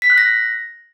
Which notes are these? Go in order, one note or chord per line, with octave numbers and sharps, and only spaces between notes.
B6
F#6
A#6